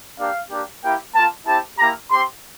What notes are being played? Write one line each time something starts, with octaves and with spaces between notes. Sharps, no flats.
A#3 D4 G4 F5
A#3 D4 G4
A#3 E4 G4 G5
A#3 F4 A5
C4 E4 G4 A5
A#3 E4 G4 A#5
C4 G4 C6